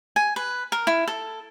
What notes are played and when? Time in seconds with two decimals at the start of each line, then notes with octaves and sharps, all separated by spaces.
0.16 G#5
0.36 B4
0.72 A#4
0.87 E4
1.08 A4